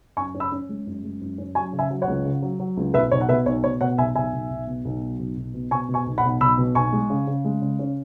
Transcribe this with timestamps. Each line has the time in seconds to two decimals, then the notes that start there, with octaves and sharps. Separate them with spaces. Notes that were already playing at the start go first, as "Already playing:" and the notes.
0.17 F#2 G#5 C#6
0.35 C#4
0.40 B5 E6
0.52 C#4
0.69 G#3
0.87 F#2
1.04 G#3
1.21 F#2
1.38 C#4
1.55 F#3 G#5 C#6
1.73 C#3
1.79 E5 G#5
1.91 F#3
2.02 C#5 F#5
2.08 C#2
2.25 C#3
2.42 F#3
2.60 F#3
2.77 C#2
2.94 B1 B4 E5
3.12 B1 C#5
3.21 F#5
3.29 B2 B4 E5
3.46 B1 C#5
3.64 B2 C#5
3.81 B2 C#5 F#5
3.98 B1 E5 G#5
4.15 B1 E5 G#5
4.33 B1
4.50 B1
4.67 B2
4.85 B1
5.02 F#3
5.19 B1
5.37 B1
5.54 B2
5.71 B2 G#5 C#6
5.89 B2
5.94 G#5 C#6
6.06 B1
6.18 F#5 B5
6.23 B1
6.41 B1 B5 E6
6.58 B2
6.75 B1 G#5 C#6
6.93 G#3
7.10 C#3
7.27 C#3
7.45 G#3
7.62 C#3
7.79 C#4